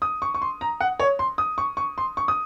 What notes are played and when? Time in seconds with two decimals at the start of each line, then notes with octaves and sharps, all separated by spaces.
0.02 D#6
0.22 C#6
0.34 C#6
0.42 C6
0.61 A#5
0.80 F#5
0.99 C#5
1.19 C6
1.38 D#6
1.58 C#6
1.77 C#6
1.98 C6
2.17 C#6
2.28 D#6